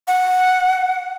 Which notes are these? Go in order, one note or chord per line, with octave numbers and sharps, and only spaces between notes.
F#5